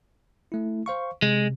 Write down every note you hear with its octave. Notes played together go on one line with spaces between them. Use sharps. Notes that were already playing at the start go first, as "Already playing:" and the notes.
A3 E4
C5 F5 C#6
C3 G#3